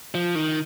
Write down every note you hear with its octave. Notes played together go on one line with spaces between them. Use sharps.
F3
D#3